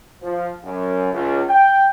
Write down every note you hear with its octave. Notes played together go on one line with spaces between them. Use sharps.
F3
F#2
C#2
G5